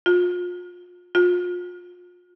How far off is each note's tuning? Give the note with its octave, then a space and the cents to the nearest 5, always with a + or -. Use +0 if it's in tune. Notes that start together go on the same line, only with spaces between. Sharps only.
F4 +35
F4 +35